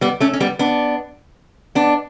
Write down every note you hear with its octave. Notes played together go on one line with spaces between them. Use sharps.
G3 B3
A3 C#4
C#4
G3 B3
B3 D4
B3 D4